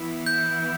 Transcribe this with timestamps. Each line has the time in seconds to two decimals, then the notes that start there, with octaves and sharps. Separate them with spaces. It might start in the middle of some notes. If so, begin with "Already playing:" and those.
Already playing: E3 B3 E4
0.26 G6